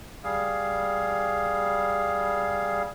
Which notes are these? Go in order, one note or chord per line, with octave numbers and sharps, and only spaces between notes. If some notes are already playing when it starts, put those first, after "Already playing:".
G3 G#4 F5